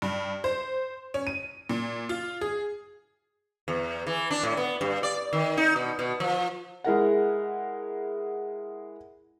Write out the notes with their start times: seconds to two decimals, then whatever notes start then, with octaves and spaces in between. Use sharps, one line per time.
0.02 G2
0.44 C5
1.14 C#4
1.27 D#7
1.69 A#2
2.09 F4
2.41 G#4
3.68 E2
4.07 E3
4.31 D4
4.43 A2
4.57 B3
4.81 G2
5.03 D5
5.33 D#3
5.57 D#4
5.76 B2
5.99 B2
6.20 F3
6.84 G#3 E4 A#4 F#5